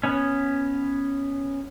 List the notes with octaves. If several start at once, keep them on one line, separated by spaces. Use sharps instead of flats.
B3 C#4